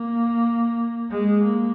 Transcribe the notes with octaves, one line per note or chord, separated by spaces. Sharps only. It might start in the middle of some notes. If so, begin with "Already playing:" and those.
Already playing: A#3
G#3
A#3